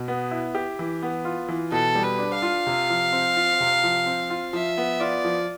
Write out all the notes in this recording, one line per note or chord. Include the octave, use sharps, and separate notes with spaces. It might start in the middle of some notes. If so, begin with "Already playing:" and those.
Already playing: B2
B3
E4
G4
E3
B3
F4
E3
B2 A4
G3
B4
D4
F5
F4
C3
F3
C4
F4
C3
F3
C4
F4
F3 E5
B3
F4 D5
F3